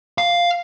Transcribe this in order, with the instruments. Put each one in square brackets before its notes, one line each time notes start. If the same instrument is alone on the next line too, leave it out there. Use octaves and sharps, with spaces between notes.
[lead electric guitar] F5